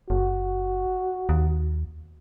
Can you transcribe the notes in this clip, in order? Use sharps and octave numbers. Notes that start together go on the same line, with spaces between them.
F#1 F#4
D#2